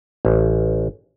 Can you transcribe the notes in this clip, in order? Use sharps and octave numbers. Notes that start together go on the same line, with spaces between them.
A1